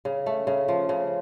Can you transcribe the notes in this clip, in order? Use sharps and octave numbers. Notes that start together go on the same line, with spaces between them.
C#3
A3
C#3
F3
C#3